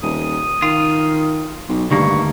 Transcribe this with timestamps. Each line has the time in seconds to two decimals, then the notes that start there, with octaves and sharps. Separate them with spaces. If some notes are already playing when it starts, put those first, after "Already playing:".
0.02 D#1 D#6
0.62 D#3 F4
1.69 B1
1.91 D2 G2 D#3 A#3 C#6